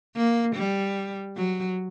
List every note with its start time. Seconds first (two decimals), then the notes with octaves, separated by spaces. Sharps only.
0.16 A#3
0.56 G3
1.37 F#3